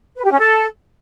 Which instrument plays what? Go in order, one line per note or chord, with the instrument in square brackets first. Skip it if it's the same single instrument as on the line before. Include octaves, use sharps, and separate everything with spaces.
[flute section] B4
G4
C#4
A4